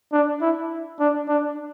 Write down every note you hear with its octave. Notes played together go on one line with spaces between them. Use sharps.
D4
E4
D4
D4